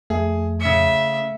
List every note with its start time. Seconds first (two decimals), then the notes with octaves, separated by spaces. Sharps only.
0.10 F2 A3 G#4
0.61 C#3 E5 C#7